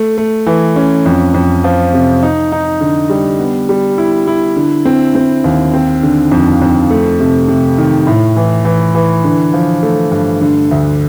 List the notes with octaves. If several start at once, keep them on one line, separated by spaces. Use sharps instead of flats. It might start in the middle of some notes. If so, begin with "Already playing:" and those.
Already playing: A3
A3
E3
C#4
F2
F2
F3
C3
D#4
D#4
D3
G3
B3
G3
E4
E4
D3
C4
C4
D#2
C4
D3
F2
F2
A3
C3
C3
D#3
A2
E3
E3
E3
D3
F3
A3
G2
D3
D2